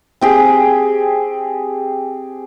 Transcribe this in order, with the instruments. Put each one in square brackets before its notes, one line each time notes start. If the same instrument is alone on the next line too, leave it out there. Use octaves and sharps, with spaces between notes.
[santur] C4 G4 G#4